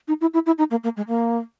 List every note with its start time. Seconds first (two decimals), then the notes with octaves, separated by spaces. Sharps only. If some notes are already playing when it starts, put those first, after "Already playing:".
0.08 D#4
0.21 E4
0.34 E4
0.46 E4
0.58 D#4
0.71 A#3
0.84 A#3
0.97 G#3
1.08 A#3